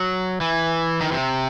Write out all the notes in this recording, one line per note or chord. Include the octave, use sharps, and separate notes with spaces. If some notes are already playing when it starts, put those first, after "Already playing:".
Already playing: F#3
E3
D#3
C3